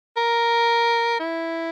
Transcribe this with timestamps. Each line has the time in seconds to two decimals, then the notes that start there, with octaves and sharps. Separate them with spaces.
0.17 A#4
1.20 E4